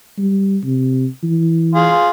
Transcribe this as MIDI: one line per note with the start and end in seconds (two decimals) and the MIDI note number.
0.18 0.58 55
0.64 1.06 48
1.23 1.93 52
1.75 2.10 65
1.75 2.10 68